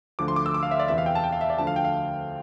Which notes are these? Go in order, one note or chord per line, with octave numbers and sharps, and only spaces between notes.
D2 D3 F3 D6
C6
D6
E6
D6
F5
E5
D5
E2 C3 E3 E5
F5
G5
A5
G5
F5
E5
D5
D2 D3 F3 A5
F5
G5
F5